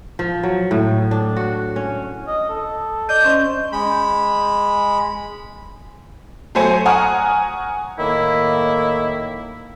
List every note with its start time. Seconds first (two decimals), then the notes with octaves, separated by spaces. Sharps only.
0.19 F3
0.43 F#3
0.71 A2
1.11 D4
1.36 F#4
1.76 C#4
2.27 D#5
2.49 A4
3.09 D5 D#5 G6
3.25 C#4 C5 D#5
3.72 G#3 B5
6.55 F#3 A3 C5 G#5 C#7
6.86 F#5 G#5 A#5 C#6 D#6 F6
7.99 A2 D#3 A#3 E4